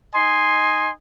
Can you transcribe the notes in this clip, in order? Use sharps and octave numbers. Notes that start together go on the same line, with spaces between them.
D#4 D#5 G#5 C6